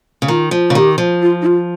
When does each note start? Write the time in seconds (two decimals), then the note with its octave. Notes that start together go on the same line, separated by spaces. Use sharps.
0.22 C#3
0.28 D#3 F4
0.51 F3
0.70 C#3
0.75 D#3 G4
0.98 F3
1.22 F4
1.41 D#4
1.46 F4